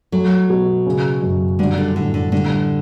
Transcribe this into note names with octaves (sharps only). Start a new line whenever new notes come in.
F#3 A3
B2
C#3
F#2
D3 G3
D3
A2 D3
D3
D3 G3